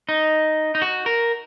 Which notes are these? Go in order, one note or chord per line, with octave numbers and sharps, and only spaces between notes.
D#4
D#4
F#4
A#4